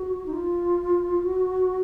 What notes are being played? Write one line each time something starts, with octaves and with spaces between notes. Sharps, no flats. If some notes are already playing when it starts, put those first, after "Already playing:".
Already playing: F#4
D#4
F4
F#4